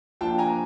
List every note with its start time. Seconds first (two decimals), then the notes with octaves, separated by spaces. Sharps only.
0.21 F3 A#3 D4 F4 G5 A5
0.38 G#5 A#5